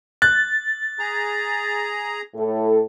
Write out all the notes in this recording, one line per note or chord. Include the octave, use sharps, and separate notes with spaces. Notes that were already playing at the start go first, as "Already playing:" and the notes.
F#6 A6
G#4 A#5
A2 A4